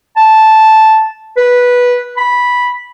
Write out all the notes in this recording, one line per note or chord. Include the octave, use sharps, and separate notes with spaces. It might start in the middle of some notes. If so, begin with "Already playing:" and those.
A5
B4
B5